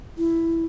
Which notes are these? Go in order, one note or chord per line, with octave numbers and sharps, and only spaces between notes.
E4